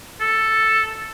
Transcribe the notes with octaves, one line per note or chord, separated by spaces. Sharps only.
A4